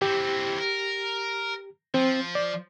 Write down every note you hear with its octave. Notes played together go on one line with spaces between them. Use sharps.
E3 C4 G4
A#4
F3 C4
D5